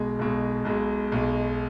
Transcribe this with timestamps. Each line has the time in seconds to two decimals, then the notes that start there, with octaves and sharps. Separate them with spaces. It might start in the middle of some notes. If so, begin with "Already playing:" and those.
Already playing: B1 B2 G#3
0.19 B1 B2 G#3
0.65 B1 B2 G#3
1.12 B1 B2 G#3